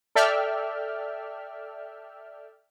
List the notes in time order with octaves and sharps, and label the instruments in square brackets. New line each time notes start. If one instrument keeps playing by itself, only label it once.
[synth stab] A4 D5 E5 G5 F6